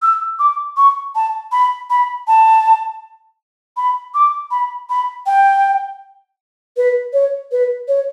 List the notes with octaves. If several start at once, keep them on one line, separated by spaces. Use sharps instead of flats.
E6
D6
C#6
A5
B5
B5
A5
B5
D6
B5
B5
G5
B4
C#5
B4
C#5